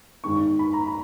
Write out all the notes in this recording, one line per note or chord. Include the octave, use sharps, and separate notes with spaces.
G#1 G#2 D#3 G#3 C#6
B5
A#5
B5